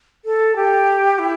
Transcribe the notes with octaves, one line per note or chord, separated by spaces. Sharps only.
A4
G4
E4